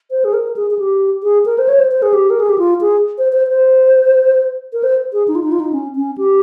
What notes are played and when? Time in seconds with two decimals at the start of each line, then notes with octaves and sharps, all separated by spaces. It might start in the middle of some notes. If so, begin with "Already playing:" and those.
0.11 C5
0.24 G#4
0.33 A#4
0.56 G#4
0.70 G#4
0.79 G4
1.23 G#4
1.46 A#4
1.58 C5
1.68 C#5
1.79 C5
1.91 C5
2.02 G#4
2.13 G4
2.30 A#4
2.40 G#4
2.49 G4
2.58 F4
2.81 G#4
3.18 C5
3.32 C5
3.48 C5
4.73 A#4
4.83 C5
5.13 G#4
5.28 D#4
5.35 F4
5.43 D#4
5.52 F4
5.60 D#4
5.72 C#4
5.95 C#4
6.18 G4